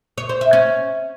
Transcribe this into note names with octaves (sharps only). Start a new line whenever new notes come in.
C#5
C5
E5
C#4